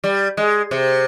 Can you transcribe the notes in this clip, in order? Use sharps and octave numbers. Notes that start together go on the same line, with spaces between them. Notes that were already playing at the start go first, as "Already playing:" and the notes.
G3
G#3
C3